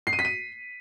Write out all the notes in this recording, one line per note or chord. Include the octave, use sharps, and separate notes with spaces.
C7
D#7
B6
D#7